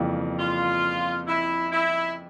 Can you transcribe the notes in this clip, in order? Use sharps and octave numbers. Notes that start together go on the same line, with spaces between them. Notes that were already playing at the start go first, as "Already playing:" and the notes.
Already playing: F2 C#3 E3 G3 A#3
F4
E4
E4